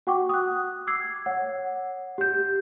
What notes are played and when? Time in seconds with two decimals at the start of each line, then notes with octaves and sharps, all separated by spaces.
0.07 F#4 F#5 G5 C#6 D6
0.29 D#6 F#6
0.87 D6 E6 G#6 C7
1.26 C#5 F#5
2.18 G4 G6